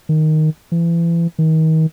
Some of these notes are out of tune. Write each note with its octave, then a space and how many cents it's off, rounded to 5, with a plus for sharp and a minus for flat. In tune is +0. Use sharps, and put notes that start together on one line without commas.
D#3 +0
E3 +35
D#3 +35